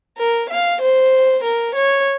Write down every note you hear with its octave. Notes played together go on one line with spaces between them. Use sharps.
A#4
F5
C5
A#4
C#5